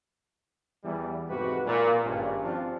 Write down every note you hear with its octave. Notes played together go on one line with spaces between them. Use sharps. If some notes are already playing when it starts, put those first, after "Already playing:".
E2 E3 G3
F2 G#2 C3 F#4 G4 B4
A#2
G#1 G2 C#4
F3 C4 D4